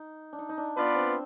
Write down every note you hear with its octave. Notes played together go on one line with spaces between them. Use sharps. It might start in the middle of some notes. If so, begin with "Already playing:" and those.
Already playing: D#4
D4
D#4
D#4
D4
B3 D4 F4 B4 D5
C4